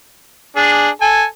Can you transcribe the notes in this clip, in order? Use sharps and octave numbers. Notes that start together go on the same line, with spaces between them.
D4 G#4
A4 G#5